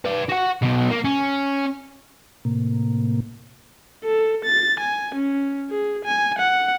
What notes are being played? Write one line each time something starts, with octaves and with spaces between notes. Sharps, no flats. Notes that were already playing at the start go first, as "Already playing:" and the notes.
B4 D5
F#4 F#5
B1 B2
A#3
C#4
A2 C3 A#3
A4
A6
G#5
C#4
G#4
G#5
F#5